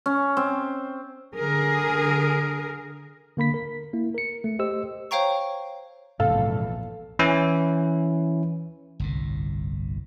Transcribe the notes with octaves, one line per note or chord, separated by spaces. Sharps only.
C#4
C4
D3 G#4 A#4
D3 A#3 B5 B6
A#4
A#3 E4
A#4 C#7
A3
G4 C5 D#5 E6
C5 C#5 F5 G5 A#5 C#6
A#1 E2 G#2 C3 A4 F5
E3 C#4 E4
G1 C2 A2